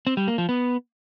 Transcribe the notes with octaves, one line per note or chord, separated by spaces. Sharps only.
C4
G3
A#3
F3
B3